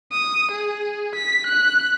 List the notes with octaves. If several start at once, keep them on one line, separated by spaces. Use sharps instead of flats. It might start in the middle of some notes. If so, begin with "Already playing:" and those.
D#6
G#4
B6
F#6